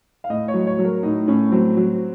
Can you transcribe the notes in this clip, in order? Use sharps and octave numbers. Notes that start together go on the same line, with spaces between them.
F5
A2 D#5
C#5
F#3
C#5
F#3
A#4
A2 D#4
A2 C#4
F#3 C4
F#3